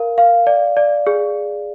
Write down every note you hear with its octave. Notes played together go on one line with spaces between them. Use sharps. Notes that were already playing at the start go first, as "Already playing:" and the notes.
Already playing: A#4 F5
F5
D5
D5
G#4